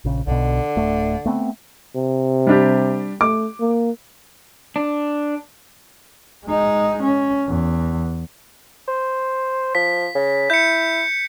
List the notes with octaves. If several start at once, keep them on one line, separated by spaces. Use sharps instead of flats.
A#1 C#3
B1 B2 D3
D1 A3
A3 B3 C4
C3
G3 D4 G4
A3 D6
A#3
D4
G#3 D#4
C#4
E2
C5
F3 B6
C#3
E4 G6 C#7